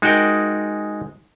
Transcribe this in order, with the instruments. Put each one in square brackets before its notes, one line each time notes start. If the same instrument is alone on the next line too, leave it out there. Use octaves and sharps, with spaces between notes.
[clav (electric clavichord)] G#3 D#4 F#4 A#4 G5